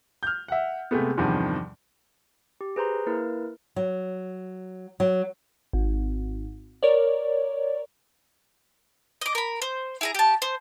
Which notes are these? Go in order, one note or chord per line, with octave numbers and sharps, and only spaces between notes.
F6 G6
E5 F#5
C3 G#3 A3 B3
E2 G2 C3 D#3 F3
G4
G#4 B4 C5 A#5 C6
A#3 E4 A#4 B4
F#3
F#3
G#1
A#4 C#5 D5
D#5 D6
A#4 B5
C5
E4 G#4 A#5
G4 A5
C5